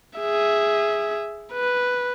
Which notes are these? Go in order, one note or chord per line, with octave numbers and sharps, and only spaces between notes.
G#4 E5
B4